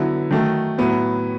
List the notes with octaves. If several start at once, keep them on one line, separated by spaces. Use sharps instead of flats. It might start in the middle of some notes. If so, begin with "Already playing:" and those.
Already playing: D3 F#3 B3 E4
D#3 F#3 A3
A2 F#3 B3 E4